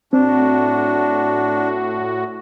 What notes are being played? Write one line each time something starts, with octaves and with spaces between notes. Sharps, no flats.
A2 C4 D4 F#4